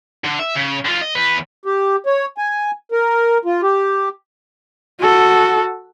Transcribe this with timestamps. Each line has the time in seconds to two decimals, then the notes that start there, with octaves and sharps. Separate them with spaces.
0.24 D3
0.40 E5
0.56 C#3
0.85 D3 F4
1.02 D#5
1.15 E2 B4
1.65 G4
2.06 C#5
2.38 G#5
2.92 A#4
3.45 F4
3.63 G4
5.00 F#4 A4